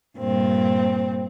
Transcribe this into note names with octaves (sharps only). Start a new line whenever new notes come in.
G2 A#2 C4